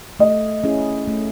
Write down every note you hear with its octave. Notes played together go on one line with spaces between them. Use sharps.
A3 D#5
C#4 E4 G#4
A3